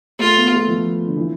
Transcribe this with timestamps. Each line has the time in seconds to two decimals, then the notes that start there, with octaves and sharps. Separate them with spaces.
0.19 A3 F4
0.36 B3
0.52 A3
0.68 F3
1.07 D3
1.17 E3